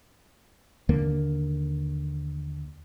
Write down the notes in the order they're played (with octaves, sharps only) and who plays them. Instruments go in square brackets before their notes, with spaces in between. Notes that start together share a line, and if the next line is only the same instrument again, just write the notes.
[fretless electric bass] D#2 D3 A#3